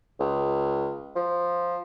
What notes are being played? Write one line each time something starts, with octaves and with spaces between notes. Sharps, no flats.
C#2
F3